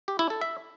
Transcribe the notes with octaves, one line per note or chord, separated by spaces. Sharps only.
G4
E4
A4
E5